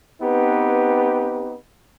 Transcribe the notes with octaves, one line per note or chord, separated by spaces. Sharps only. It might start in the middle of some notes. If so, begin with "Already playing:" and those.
B3 C4 D#4 G4 B4